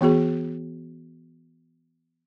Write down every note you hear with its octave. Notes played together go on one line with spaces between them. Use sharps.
E3 B3 F#4 G#4